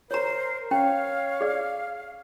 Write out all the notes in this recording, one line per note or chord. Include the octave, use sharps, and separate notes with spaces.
A#4 C5 C#5 A#5
C#4 C#5 F5 G5
G#4 D5